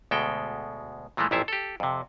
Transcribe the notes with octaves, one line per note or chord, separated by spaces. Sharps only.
D2 B2 G#3 A4 G5
A#2 E3 F3 G#3 A3
A1 F2 A#2 E4 F4 E5
G4 A4
F2 C3